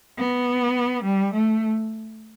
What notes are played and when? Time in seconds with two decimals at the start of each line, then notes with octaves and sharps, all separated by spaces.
0.17 B3
1.04 G3
1.33 A3